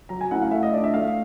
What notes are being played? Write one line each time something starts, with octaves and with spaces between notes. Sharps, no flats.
F#3 A#5
G#5
A3 C#4 E4 F#5
F5
A3 E5
D#5
D4 F4 D5
E5
A3 F5